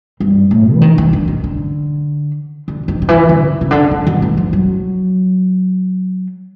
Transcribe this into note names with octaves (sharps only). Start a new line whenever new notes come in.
G2
A2
E3
D#3
E3
D3
D#3
D3
D3
D#3
D#3
E3
D3
C#3
D3
D#3
D#3
E3
F3
F#3